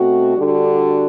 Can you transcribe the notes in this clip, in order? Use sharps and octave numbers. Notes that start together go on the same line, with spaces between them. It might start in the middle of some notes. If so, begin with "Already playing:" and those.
Already playing: B2 A3 C4 F#4
D3 G3 D4 F#4 A4